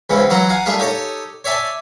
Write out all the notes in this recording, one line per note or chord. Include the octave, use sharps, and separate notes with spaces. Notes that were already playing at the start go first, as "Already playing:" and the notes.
C#2 G#2 C#3 E3 B3
E3 F#3 F4 F#5 A#5
F5 F#5 G#5 A#5
G3 A3 D4 F4 G#4 F5
D#4 G4 A4 C#5 D#5
C#5 D5 E5 G#5 A5